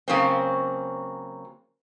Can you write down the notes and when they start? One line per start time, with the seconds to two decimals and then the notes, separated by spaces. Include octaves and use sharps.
0.08 C#3 F#3 A#3 C4